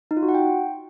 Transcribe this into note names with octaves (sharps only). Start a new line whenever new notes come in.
D#4
F4
F#4
F#5
G5